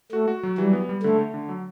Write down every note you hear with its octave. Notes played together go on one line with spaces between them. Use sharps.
A3 F#4
F#4
F#3
E3 G3
B3
G3
D3 A3
A3
D3
F#3